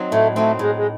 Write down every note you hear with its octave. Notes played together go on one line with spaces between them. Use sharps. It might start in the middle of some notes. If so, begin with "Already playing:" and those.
Already playing: F#3 C4 D#4
A2 A3
F#3 A3 C4 D#4
A2 G#3
G#3